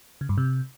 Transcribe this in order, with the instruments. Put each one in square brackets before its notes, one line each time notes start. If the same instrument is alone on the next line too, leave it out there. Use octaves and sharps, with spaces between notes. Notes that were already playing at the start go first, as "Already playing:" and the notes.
[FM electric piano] C#3
G2
C3